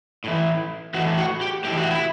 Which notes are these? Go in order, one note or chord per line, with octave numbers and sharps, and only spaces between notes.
A2 E3
A2 E3 F#4
F#4
G4
A2 E3 G4
F#4
E4